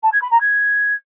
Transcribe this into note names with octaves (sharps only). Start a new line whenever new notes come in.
A5
G#6
B5
A#5
G#6